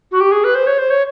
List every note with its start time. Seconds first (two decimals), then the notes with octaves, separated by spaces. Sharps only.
0.12 F#4
0.20 G4
0.32 G#4
0.44 B4
0.55 C5
0.67 C#5
0.78 C5
0.90 C#5